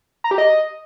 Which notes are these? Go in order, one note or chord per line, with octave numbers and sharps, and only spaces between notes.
A#5
G4
D#5